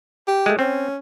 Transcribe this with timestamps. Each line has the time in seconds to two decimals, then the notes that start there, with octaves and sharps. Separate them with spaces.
0.28 G4
0.46 G#3 A3
0.59 C4 C#4